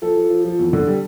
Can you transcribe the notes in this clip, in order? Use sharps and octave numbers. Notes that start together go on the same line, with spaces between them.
F3 A4
F3
F3
F3
E2
D3
G3